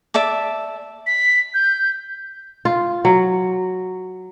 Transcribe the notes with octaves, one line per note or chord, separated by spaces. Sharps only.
D5 E5 A5 D6
B6
G6
F4
F#3